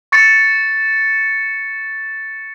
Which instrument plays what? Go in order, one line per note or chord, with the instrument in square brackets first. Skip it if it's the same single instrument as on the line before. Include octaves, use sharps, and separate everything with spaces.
[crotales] C#6 A6 C#7